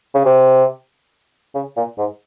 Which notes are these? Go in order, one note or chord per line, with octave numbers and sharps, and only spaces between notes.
C#3
C3
C#3
A#2
G#2